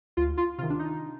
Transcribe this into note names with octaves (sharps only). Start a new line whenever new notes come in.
D2 F4
F4
C3 D#3 F4
D4
D#4